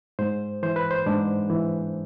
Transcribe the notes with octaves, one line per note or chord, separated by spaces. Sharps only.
G#2 C5
E3 C5
B4
C5
G#2 D4
E3